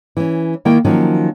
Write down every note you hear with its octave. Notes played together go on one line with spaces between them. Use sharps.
E3 C#4
D#3 A#3 E4 G5
D#3 F3 F#3 A#3 C#4